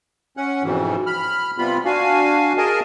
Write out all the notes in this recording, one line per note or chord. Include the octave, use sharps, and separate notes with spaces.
C#4 F#5
F2 G#2 B2 E3
B5 F6
C3 G3 B3 F4 B5
D4 F#4 F5 G#5
G#4 A#4 D#5 G#5 A5